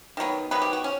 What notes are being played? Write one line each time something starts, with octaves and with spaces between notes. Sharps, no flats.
D#3 F#3 B3
D#3 F#3 B3 B4
G4
F#4
C#4